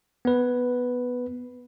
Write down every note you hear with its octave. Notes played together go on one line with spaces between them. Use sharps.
B3 B4